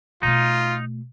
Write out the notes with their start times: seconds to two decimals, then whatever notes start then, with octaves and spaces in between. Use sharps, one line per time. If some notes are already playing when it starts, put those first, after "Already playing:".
0.23 B2 A3 D#4 F4